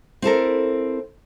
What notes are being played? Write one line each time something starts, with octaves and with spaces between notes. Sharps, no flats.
C4 E4 A4 A#4